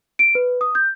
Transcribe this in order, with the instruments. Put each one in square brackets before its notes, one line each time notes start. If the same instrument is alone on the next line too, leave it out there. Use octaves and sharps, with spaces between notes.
[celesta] D7
B4
D#6
G6